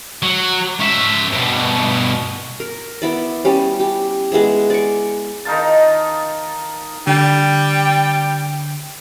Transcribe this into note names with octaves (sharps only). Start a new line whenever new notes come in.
F#3
C#4 E5
G2 B2
A#4
B3 E4 D5
G3 C#4
G4
G#3 B3 E4 G#4
D5 C#6
D#3 D#4 F4 A5
D3 G3 G5